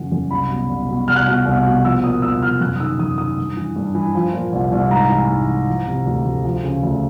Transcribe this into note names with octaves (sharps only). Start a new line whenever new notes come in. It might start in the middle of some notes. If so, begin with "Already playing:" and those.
Already playing: F#2 C#3 E3 F#5
F#2
C2 B5
B2
C2
B2
C2 F6
F#6
B2 F6
C2
B2
F3 E6
A#2 D#6
C2 E6
C2 F6
F#2 F#6
D#6
D#3 E6
F#2 D#6
D#3 D#6
G2
E3
G2
E3
F3
A#2
C2
C2
G#2 A#5
E3
G#2
E3
F3
C3
D2
D2
F3
C#3
D2